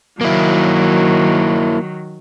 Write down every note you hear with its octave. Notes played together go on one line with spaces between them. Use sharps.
D#3 F#3 A#3 E4